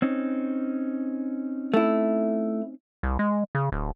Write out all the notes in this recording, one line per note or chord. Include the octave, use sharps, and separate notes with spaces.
C4 C#4 D#4
A3 E4
C2
G#3
C#3
D1